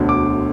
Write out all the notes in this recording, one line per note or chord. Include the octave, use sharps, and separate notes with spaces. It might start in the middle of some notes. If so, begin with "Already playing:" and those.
Already playing: E1 D2 D3
D6